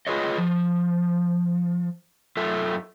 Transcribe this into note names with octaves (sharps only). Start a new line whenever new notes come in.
F4 G#4 B4 C#5 D#5
F3
F#2 F4 A4 E5